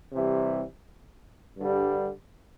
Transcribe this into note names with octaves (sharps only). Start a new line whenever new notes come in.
C3 E3 G3
G2 D3 G3